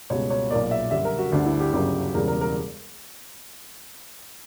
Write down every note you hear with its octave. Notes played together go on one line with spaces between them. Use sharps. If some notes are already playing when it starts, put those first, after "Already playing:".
C#2 B2 G3 C#5
C#5
B1 A#2 A#3 D5
E5
F#2 D3 G3 E5
A#4
F#4
D2 D3 G3 D4
E4
G4
G1 F#2 C#3 F#3 A#3 G4
E1 E2 C#3 G3 A#4
A#4
A#4